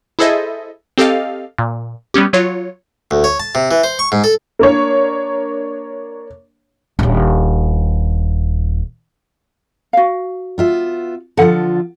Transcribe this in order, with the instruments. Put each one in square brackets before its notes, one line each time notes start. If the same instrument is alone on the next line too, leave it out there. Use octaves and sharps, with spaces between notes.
[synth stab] E4 G#4 A4 C5 D#5 E5
C4 G4 A4 D#5 F5
A#2
G3 B3 C#4 G4
F#3 F4 C#5
[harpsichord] D2
C#5
A5
C3
E3
C5
C#6
G#2
A4
[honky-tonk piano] A#3 D4 C#5
[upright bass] D#1 D4
[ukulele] F#4 F5
[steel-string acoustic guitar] B3 F4 E5
[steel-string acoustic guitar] D3 F3 F4 [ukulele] A4 F#5